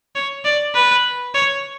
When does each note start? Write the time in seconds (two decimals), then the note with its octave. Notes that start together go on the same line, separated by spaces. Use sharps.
0.15 C#5
0.45 D5
0.75 B4
1.34 C#5